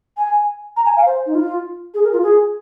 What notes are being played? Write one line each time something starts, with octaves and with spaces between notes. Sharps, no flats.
G#5
A#5
G#5
F5
C5
D#4
F4
G#4
A#4
F4
G#4